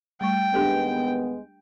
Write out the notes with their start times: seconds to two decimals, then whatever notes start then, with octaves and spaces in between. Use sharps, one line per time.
0.21 G3 A3 G5 C#6
0.54 D#2 G#3 B3 D4 G4 A4